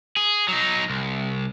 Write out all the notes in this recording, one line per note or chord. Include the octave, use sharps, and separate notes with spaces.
G#4
F#3 D#4
C2